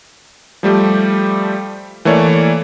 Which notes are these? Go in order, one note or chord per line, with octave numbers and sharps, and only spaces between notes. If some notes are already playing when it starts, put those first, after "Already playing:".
F3 G3 A3 G4
E3 A3 A#3 C#5 D5